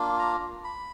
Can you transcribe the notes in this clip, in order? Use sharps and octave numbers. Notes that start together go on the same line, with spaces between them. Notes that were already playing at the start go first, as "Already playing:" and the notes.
Already playing: A#3 D4 F4
A#5
B5